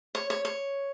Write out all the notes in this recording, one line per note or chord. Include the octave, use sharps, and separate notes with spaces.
C#5
C#5
C#5